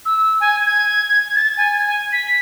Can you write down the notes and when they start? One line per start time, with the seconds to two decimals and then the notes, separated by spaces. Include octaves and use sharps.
0.05 E6
0.41 G#5
0.66 G#6
1.36 A6
1.57 G#5
2.13 B6